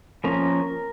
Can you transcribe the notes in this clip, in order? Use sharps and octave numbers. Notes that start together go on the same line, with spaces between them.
F3 A#3 C#4 A#4 A#5